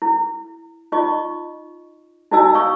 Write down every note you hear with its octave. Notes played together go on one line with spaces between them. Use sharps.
E4
D#4 F4 D#5 C#6
D#4 E4 F#4 D#5 G#5 E6
F5 C#6 D#6 E6